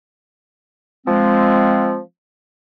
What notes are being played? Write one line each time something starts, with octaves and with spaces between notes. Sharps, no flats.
F3 G#3 C4